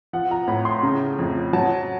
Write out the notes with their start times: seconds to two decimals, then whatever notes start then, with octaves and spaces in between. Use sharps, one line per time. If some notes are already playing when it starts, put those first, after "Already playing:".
0.13 F3 F#5
0.31 A#5
0.48 A2 B5
0.65 C6
0.83 C#3 A#5
1.19 F2
1.53 F#3 A5